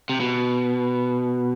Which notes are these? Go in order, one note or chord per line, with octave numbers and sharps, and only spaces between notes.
C3
B2